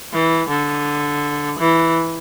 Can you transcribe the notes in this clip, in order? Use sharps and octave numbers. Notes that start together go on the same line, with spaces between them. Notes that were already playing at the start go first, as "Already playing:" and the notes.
E3
D3
E3